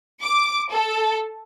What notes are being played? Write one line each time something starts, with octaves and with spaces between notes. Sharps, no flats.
D6
A4